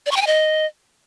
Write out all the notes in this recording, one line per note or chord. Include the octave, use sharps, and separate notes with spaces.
D5
C#6
G5
G#5
D#5